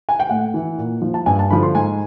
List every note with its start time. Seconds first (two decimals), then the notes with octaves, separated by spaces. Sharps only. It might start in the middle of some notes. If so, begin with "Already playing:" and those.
0.09 G#5
0.20 G5
0.29 A2 F#5
0.54 E3
0.78 A#2
1.02 F3
1.14 A5
1.26 G2 G#5
1.39 A5
1.50 D3 F3 B5
1.63 C6
1.75 G#2 G#5